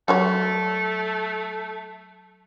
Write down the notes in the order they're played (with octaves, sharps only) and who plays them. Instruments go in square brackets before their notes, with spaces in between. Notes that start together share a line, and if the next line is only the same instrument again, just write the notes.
[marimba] F#3 [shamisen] G3 F#4 C#5 [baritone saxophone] A3